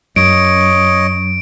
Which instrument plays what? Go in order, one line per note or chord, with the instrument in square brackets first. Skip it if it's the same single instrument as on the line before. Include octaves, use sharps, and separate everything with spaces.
[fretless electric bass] F#2 [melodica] C#5 D#5 [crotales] D7